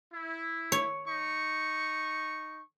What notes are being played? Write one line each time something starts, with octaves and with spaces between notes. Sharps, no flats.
E4
C#5
D#4 C#6